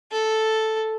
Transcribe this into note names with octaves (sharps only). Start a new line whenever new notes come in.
A4